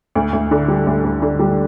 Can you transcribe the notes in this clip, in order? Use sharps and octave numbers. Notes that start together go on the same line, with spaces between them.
D2
D2
D3
G3
D2
D2
D3
G3